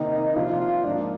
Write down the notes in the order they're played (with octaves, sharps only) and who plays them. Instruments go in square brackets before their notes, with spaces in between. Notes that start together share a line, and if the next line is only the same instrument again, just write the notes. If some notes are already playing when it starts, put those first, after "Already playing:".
Already playing: [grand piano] C3 D#3 A#3 [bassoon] D#4
[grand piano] C3 F3 A#3 D4 [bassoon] F4
[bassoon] F4
[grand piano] G#2 F3 A#3 D#4 [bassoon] D4